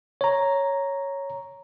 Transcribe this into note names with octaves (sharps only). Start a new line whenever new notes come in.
C#5 A#5